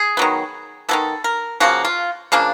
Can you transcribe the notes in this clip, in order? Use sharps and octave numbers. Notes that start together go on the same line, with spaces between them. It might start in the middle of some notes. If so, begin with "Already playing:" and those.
Already playing: G#4
D#3 F#3 B3
D#3 F#3 B3 A4
A#4
C#3 F3 A#3 F#4
F4
C#3 F3 A#3 D4